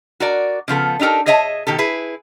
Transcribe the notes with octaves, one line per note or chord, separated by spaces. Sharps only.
F#4 A#4 D5
C#3 F3 B3 A4
D4 D#4 G4 A4 A#4
G#4 C#5 D#5 E5 G#5 A5
B2 D#3 G4 A4
E4 G#4 B4